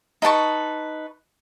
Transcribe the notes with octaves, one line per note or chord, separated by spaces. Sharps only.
D#4 B4 A5 C#6